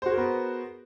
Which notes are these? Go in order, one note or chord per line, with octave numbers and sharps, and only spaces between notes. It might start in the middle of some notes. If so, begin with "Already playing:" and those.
B3 F#4 G#4 A#4 C5